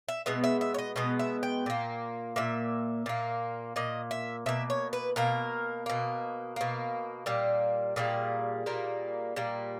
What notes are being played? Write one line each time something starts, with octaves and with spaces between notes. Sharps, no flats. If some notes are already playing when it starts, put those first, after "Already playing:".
E5
B2 G#3 B3 E5
E5
E5
C#5
D#5
B2 G#3 B3 D#5
E5
G5
A#2 A#3
A#2 A#3 E5
A#2 A#3
A#2 A#3 D#5
E5
B2 A#3 E5
C#5
B4
B2 A#3 A#4
B2 A#3
B2 A#3
A#2 G3 A#3
A#2 G3 A#3 G#4
A#2 G3 A#3
A#2 G3 A#3